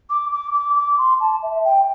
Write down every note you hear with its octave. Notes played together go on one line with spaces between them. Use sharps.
D6
D6
D6
D6
C6
A5
E5
G5